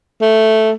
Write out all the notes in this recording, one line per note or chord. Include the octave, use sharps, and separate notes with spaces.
A3